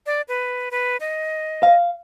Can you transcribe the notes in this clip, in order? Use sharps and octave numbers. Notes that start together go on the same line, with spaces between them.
D5
B4
B4
D#5
F5